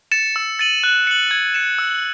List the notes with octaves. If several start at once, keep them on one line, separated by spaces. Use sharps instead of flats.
A6 C#7 E7
E6
A6 D#7 F#7
F#6
C#7 F#7
G#6
C#7 E7
E6